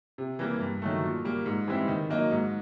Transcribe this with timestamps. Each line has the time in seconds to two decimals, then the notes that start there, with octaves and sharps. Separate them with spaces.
0.18 C3
0.39 E3 G3 A#3
0.60 G2
0.82 D#3 F#3 A3
1.04 A#2
1.25 G3 A#3
1.46 G#2
1.68 E3 G3 C4 E4
1.88 D#3
2.10 F#3 A#3 D#4
2.31 G#2